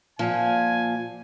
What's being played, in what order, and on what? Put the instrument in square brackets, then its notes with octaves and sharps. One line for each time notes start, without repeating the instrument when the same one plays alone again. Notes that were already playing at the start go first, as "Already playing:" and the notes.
[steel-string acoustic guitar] A#2 F3 [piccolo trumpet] G#5